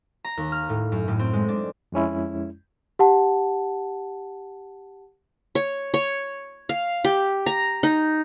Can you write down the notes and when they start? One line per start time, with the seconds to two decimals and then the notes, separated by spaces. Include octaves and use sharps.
0.24 A#5
0.37 D#2
0.52 F6
0.69 A2
0.92 F#2
1.08 A2
1.19 C4
1.33 G#3
1.48 D4
1.92 F2 G#3 C#4 E4
2.99 G4 F#5 A5
5.55 C#5
5.94 C#5
6.69 F5
7.04 G4
7.46 A#5
7.83 D#4